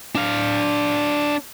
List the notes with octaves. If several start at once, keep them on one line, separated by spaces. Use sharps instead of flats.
D4 F5